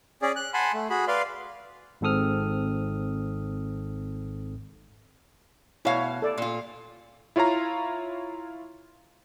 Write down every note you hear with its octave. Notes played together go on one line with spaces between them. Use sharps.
C#4 G#4 D5
F#6
F#5 G#5 A5 B5 C6
A3
F#4 G#4 B5
B4 D5 F5 C6
G#1 G#2 C4 A4 D#6 F6
B2 E4 C#5 F5
A4 D5
A#2 F4
E4 F4 C#5 F5 A#5